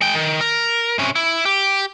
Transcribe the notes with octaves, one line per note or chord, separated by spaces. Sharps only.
G#3 G5
D#3
A#4
C3 C#4
E4
G4